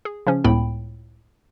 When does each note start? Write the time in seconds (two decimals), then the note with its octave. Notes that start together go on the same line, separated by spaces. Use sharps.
0.05 G#4
0.27 C#3 F3 C#4
0.44 C#2 A2 B3 G5 B5